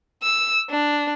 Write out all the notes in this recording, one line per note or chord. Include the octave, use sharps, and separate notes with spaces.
E6
D4